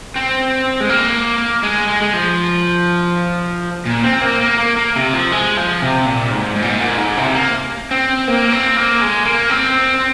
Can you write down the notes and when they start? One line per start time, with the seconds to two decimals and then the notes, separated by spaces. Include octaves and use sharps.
0.16 C4
0.81 G#3
0.90 A#3
1.63 G#3
1.88 G#3
2.02 G#3
2.13 F3
3.86 A#2
4.04 C4
4.22 A#3
4.41 A#3
4.59 A#3
4.77 A#3
4.96 C3
5.14 F3
5.32 G#3
5.57 F3
5.82 C3
6.06 A#2
6.31 G#2
6.56 G#2
6.62 A#2
6.70 G#2
6.80 A#2
6.98 G#2
7.17 C3
7.35 A#3
7.91 C4
8.28 A#3
8.52 C4
8.77 A#3
9.01 G#3
9.25 A#3
9.50 C4